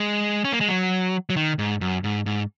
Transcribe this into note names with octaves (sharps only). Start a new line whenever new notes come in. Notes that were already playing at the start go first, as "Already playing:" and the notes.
Already playing: G#3
C#4
A#3
G#3
F#3
F#3
D#3
G#2
F#2
G#2
G#2